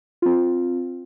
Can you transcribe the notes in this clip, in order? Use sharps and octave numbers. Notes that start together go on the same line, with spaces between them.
C4 F4